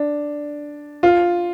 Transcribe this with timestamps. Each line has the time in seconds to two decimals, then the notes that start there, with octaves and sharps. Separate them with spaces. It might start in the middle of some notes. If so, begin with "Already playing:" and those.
Already playing: D4
1.03 F4